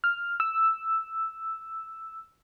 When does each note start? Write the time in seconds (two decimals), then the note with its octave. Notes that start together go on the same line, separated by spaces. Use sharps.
0.04 F6
0.40 E6